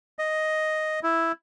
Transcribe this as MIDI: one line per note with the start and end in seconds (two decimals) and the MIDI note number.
0.19 1.00 75
1.03 1.32 64